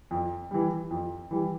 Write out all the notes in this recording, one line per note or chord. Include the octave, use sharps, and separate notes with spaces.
F2
E3 G3
F2
E3 G3